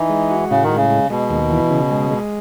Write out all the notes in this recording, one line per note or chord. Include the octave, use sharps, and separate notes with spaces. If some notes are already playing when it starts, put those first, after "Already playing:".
Already playing: E3 D#4
G#3
F#4
A2 C#3
D#3
G#3
C#3
G#3
B2 G#3
D#2
E3
C#3
G#3
G#3